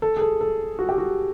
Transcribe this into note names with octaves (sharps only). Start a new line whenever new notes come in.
A4
G#4
A4
A4
F#4
G4
F#4